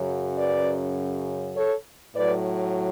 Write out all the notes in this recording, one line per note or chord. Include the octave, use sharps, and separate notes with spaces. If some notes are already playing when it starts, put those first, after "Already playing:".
Already playing: F#2 C#3 F#3
B4 D5
A4 C#5
A2 F#3 B4 D5